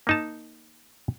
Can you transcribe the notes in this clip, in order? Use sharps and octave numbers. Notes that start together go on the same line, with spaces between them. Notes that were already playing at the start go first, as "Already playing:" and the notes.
A#3 D#4 A5